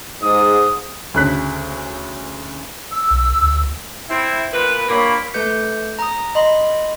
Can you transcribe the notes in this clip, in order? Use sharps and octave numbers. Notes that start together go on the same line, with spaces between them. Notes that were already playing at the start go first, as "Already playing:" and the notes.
G#2 D#6
D2 C#3 F#6 B6
E6
B1
D2
C4 E4
A#2 B4
G2 A#2 A#3 C#5 B5
A3 A4 B4 G6 C#7
A#5 D#6
D#5 B5 C6